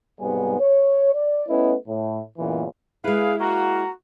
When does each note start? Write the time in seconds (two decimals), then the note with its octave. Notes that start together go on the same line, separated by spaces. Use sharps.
0.20 B1 G#2 C3 G3 B3 G#5
0.60 C#5
1.14 D5
1.48 A3 B3 C#4 E4 B4 D#5
1.87 A2
2.38 C#2 F#2 A#2 E3 B3
3.04 G#3 E4 G#4 B4 F5
3.40 A#3 F4 F#4 A#5